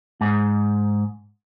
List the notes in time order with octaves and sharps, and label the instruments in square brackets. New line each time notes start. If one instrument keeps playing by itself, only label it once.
[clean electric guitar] G#2